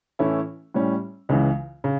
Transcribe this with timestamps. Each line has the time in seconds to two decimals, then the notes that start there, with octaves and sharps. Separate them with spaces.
0.19 A2 E3 A3 C#4 E4
0.74 A2 G3 C#4
1.29 C#2 C#3 E3
1.84 C#3